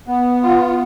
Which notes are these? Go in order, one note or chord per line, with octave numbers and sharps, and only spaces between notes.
B3
F4